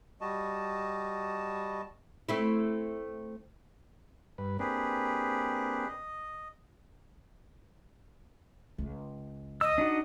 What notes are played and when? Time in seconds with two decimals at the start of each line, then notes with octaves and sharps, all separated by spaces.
0.21 G3 F#4 D#5 A5
2.29 A3 C4 E4
4.38 G2 B4
4.59 A#3 C4 D4 G4 G#4 B4
5.88 D#5
8.78 C#2
9.61 D#5 E6
9.78 D4 D#4 F#4